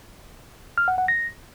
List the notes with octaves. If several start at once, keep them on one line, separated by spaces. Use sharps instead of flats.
F6
F#5
F#5
A#6